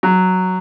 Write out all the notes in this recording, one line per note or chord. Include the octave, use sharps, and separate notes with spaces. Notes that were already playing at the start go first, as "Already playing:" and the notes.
F#3